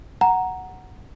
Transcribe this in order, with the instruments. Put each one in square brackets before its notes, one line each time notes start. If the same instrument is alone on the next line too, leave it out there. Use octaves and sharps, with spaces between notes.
[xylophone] F#5 A#5